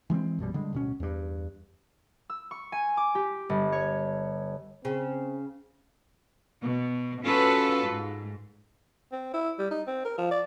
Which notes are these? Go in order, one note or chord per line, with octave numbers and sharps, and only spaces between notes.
E3 G#3 B3 C4
A#1 F#2 B2 G3
D3 G3 G#3
D1 B2 C#4
E2 G2
E6
C#6
G#5
D6
G4
G1
C#5
C#3 C4
B2
C#4 F4 F#4 A4 B4
G#2
C4
E4
G3
D#4
C4
A#4
F3
D5